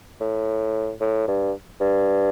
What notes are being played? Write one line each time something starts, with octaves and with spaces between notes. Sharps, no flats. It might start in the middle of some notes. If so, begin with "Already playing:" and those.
A2
A2
G2
G2